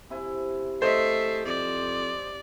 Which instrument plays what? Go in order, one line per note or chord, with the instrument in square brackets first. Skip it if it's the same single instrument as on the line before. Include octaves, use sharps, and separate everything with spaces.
[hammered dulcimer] C3 E4 G#5
[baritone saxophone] A3 [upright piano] C5 D#5 [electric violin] E5 C7
[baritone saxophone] F2 [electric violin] D5